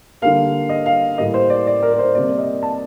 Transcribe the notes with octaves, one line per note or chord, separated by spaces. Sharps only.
D3 G3 A#3 F5
D#5
F5
A2 G3 A#3 D#5
C5
D5
D5
A#4
A#4
C5
C3 G3 A#3 D5
D#5
A5